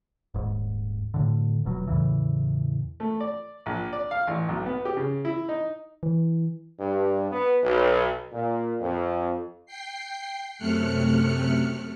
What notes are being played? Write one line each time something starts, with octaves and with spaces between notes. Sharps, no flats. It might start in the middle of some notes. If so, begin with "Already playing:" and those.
D#1 G#2
A2 D3
D#1 B2 F#3
E2 A2 C#3 E3
A3
D5
A#1
D5
F5
A1
B1
B3
G4
C#3
E4
D#4
E3
G2
B3
B1
A#2
F2
G5 C7
F#2 C3 A3 F6 F#6 C#7